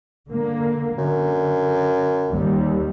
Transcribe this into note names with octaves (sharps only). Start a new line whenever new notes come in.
D3 A#3
F#2 D3
D#2 G3